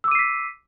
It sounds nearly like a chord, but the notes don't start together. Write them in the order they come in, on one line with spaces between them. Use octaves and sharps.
E6 D6 D#7 C7 B6